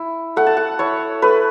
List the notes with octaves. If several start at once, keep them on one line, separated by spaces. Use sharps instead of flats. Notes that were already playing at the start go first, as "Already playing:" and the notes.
Already playing: E4
A3 F#5
A5
F#5
E4 C#5
A3 B4